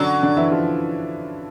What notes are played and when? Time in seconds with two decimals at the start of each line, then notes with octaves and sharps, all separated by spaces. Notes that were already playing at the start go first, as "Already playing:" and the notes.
Already playing: D3 F#3 C#4 D4
0.23 D3 D4
0.37 E3 E4
0.51 F3 F4